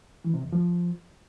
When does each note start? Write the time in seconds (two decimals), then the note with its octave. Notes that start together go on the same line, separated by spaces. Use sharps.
0.24 E3
0.34 C3
0.43 E2
0.52 F3